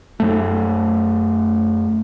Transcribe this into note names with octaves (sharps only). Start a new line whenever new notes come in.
F#2 A3